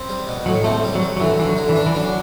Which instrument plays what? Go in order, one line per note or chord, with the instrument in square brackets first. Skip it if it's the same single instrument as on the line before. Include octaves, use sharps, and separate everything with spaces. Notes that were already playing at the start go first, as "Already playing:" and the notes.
Already playing: [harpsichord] C4
G3
B2
[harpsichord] A2 [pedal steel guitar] F#3
[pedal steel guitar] A3 [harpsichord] C4
[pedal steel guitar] G3
[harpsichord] G3
[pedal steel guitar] F#3
[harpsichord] G3
[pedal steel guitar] F#3
[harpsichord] D3 [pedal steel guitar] E3
[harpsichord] D3 [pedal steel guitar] E3
[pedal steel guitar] F#3
[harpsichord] D3
[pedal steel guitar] E3
[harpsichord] D4
[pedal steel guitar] E3
[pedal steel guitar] F#3 [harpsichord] D4